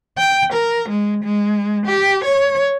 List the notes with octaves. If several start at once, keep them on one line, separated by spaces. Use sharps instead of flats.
G5
A#4
G#3
G#3
G4
C#5